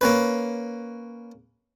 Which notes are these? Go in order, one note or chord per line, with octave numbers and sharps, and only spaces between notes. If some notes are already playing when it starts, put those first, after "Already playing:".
A#3 C#4 B4